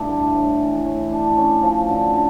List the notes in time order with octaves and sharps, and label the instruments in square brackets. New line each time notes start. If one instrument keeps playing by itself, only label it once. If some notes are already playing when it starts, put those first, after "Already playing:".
Already playing: [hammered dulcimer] G2 A3 E4
D3
A2
E3
A2
D4
C#4
F3
D3
D3